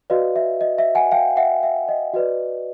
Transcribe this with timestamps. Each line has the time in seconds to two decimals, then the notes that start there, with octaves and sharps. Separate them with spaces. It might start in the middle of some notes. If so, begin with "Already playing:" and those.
0.10 F#4 B4 D5 D#5 F5
0.36 E5
0.61 D#5
0.78 E5
0.95 F#5 G#5
1.12 F5 G5
1.37 E5 F#5
1.63 E5
1.89 D#5
2.13 F#4 B4 D5 D#5